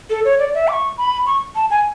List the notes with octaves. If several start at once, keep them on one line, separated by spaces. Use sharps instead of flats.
A4
C#5
D5
E5
D6
C#6
B5
C#6
A5
G#5